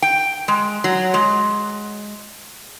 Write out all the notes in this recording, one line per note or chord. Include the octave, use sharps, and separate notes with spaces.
G5
G#3
F#3
G#3